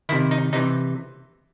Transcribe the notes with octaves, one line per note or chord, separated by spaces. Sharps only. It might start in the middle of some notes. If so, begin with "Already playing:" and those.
C3 D#3 E4
D#4
C3 E3 D#4